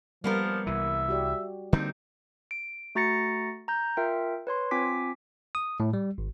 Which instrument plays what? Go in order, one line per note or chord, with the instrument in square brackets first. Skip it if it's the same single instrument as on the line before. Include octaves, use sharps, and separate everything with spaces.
[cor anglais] F3 [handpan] G3 [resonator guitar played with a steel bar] A#3 B3 A#4
[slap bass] C2 E3 [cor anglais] E5
[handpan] F#4 G4 D5
[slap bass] D3 G3 A#3 [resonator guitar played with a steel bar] C4 D#4
[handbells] D7
A3 F#4 A#5 A6 A#6 C#7
A#5 G6
F4 A#4 E5 G5
B4 C#5 C6
C4 F4 G#5 D6 B6
[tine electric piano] D#6
A2
G3
G#1